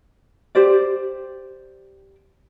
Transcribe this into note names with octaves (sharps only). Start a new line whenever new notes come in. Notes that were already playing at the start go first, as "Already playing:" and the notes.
G4 C5 D5